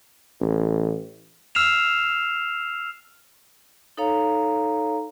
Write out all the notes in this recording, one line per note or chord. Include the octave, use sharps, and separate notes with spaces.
A1
E6 F6 C7 E7 F7
D#4 A4 C#5 F5 A#5